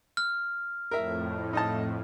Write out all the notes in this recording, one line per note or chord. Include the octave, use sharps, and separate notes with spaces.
F6
F2 A2 A#4 E5
D#4 D#5 A5